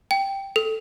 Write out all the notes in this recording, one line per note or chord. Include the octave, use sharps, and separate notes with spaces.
G5
A4